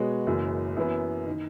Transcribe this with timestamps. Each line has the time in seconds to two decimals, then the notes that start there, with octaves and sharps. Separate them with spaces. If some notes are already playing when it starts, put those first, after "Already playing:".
Already playing: B2 G#3 B3 F#4 C#5
0.26 F#1 F#2 E3
0.76 F#2 E3 B3 E4
1.27 D#3